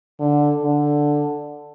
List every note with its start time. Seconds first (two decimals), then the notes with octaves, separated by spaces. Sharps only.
0.20 D3
0.63 D3